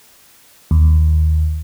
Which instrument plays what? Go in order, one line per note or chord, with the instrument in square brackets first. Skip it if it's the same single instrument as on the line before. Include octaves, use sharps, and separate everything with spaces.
[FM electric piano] D#2